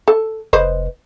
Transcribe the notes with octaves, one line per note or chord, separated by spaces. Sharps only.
A4
F1 B4 C5 D#5